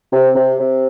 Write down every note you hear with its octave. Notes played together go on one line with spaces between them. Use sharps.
C3
C3
C3